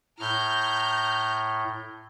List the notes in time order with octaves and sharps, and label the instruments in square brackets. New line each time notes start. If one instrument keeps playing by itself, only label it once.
[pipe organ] A2 [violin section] A#5 F6 G6